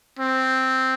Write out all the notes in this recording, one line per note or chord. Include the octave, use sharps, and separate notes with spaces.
C4